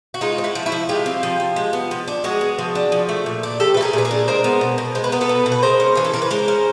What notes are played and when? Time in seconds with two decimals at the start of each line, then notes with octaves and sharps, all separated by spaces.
0.14 F#4
0.21 G#3 D#4 F4
0.38 C4
0.44 E4 F#4
0.55 F3
0.66 E4 F#4
0.72 F3
0.89 G#3 F4 G4
1.06 C4
1.23 F3
1.40 F3
1.56 G#3
1.73 B3
1.91 F3
2.08 D4
2.24 G#3 F#4 G#4
2.41 B3
2.59 F3
2.75 D4
2.92 F3
3.09 A3
3.26 A#2
3.43 D4
3.60 F3 G4 A4
3.74 A3 B4
3.82 G#4 A#4
3.93 A#2 B4
4.05 G#4 A#4
4.11 D4
4.28 G#3 A#4 C5
4.44 B3
4.61 B2
4.78 B2
4.95 G#3 C5
5.04 B4
5.12 B3 A#4
5.21 A4 B4
5.29 B2
5.46 B2
5.52 B4
5.63 G#3 A#4 C5
5.80 C#4
5.95 E3 G#4
6.04 A4
6.13 E3 A#4
6.22 B4
6.31 G#3 A#4 C5
6.48 C#4